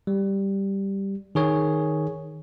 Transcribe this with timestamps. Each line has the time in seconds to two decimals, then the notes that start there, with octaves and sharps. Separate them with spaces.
0.07 G3
1.35 D#3 G#4 C#5